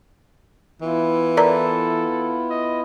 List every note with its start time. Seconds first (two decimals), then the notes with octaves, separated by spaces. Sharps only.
0.82 E3 B3 E4 F4
1.37 A4 A#4 D5 A#5
2.50 D#5